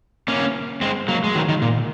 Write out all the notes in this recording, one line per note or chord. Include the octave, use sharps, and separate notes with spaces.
A#3 C#4
G#3 C4
F#3 A#3
G#3
D#3 F#3
D#3
A#2